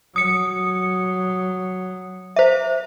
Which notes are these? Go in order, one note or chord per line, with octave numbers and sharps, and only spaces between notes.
F#3 D#6 C#7
C5 E5